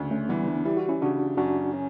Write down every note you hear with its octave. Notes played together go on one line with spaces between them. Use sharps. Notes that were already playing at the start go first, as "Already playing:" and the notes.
Already playing: D2 C#3
A3 C#4
E3 G3 B3
B3 D4
G3 E4
F#4
C#4 E4
C#3 D4 F#4
F#2 D4 F#4
C#4